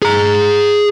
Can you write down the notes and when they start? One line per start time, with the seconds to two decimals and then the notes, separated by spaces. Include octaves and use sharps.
0.02 G#4 A#5